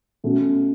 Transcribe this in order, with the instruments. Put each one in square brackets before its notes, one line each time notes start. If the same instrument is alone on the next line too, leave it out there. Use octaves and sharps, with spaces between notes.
[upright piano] B2 A3 C#4 F#4